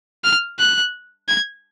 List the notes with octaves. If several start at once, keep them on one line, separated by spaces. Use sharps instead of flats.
F6
F#6
G#6